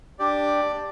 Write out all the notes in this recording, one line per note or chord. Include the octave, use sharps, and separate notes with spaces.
D4 G4 D5